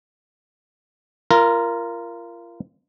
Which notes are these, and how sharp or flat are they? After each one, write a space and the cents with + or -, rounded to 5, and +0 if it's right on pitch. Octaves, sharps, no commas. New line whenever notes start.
F4 -30 A#4 +0